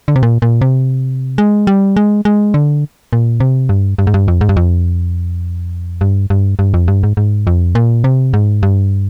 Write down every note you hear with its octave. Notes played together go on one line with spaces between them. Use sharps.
D3
C3
A#2
A#2
C3
G#3
G3
G#3
G#3
D3
A#2
C3
G2
G2
G#2
G2
F2
G#2
G2
F2
G2
G2
G2
F2
G2
G#2
G#2
F2
A#2
C3
G#2
G2